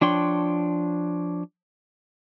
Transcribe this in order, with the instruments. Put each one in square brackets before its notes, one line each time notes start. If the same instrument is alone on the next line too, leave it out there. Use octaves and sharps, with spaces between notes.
[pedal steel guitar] F3 D4 C#5 G5 C6